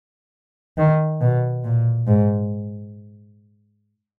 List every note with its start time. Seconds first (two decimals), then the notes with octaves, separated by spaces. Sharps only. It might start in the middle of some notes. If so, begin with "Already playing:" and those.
0.78 D#3
1.21 B2
1.64 A#2
2.07 G#2